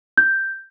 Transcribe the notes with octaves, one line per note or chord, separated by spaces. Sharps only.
G6